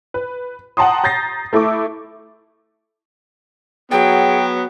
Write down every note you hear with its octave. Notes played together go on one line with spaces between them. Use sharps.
B4
F#5 G5 A5 A#5 C6 D#6
A#5 G6 A6 A#6 C7
A3 E4 A4 C#6 D6
F#3 B3 G#4 G5